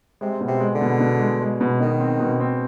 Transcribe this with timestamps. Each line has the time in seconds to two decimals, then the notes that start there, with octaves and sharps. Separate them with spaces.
0.21 C3 G#3
0.41 B2
0.48 C3
0.61 G#3
0.74 D3
0.81 B2
1.00 B2
1.20 G#3
1.41 G#3
1.61 B2
1.80 B2 D#3
2.00 C4
2.20 B2
2.40 C4